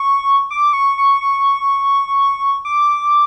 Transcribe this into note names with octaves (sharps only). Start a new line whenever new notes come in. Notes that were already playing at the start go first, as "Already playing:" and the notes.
Already playing: C#6
D6
C#6
C#6
C#6
D6